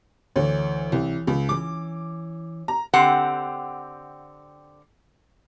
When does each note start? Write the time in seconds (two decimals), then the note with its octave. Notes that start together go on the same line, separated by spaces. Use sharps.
0.36 D2 E3 C#5
0.92 C2
1.27 C#2
1.49 E3 C#4 D6
2.68 A#5
2.94 D3 C4 G4 F#5